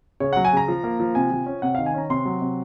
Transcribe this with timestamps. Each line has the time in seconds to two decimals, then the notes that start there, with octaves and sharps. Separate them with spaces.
0.20 C#3 C#5
0.33 F#3 F#5
0.45 G#5
0.53 C#3 A#5
0.68 F3
0.84 A#3
1.00 F3
1.15 C3 G#5
1.32 F3
1.46 C#4
1.62 C3 F#5
1.75 D#3 F5
1.86 G#5
1.94 C#4 A#5
2.10 C3 C6
2.25 F#3
2.41 C3